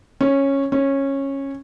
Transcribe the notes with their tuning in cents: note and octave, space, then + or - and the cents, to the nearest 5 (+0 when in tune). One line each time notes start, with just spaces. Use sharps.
C#4 -10
C#4 -15